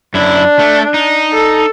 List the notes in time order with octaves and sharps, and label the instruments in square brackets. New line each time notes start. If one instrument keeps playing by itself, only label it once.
[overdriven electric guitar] F#2 E4 [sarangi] D4
[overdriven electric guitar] A3
D#4
[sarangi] A4